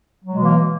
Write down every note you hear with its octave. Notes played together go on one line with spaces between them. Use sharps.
B2 E3 F#3 G#3 A#3